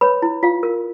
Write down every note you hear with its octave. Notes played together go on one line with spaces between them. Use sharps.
B4 C#5 B5
E4
F4 F5
A#4